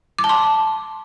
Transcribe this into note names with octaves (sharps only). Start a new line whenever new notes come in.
D6
A5
C6